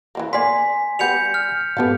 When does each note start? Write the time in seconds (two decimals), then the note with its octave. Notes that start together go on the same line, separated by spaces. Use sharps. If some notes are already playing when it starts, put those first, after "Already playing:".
0.15 E3 G3 A#3
0.33 A#3 B3 D5 G#5 C6 B6
0.99 G3 B3 G4 G6 C#7 F7
1.34 F6
1.77 G#2 B3 G4 A4 F5